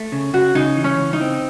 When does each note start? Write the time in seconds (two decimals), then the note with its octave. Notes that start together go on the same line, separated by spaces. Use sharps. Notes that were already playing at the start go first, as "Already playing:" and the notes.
Already playing: A3
0.12 C#3
0.33 C#3 F#4
0.55 C#3 D#4
0.76 E3
0.84 C#4
0.98 C#2
1.13 D#4
1.21 C4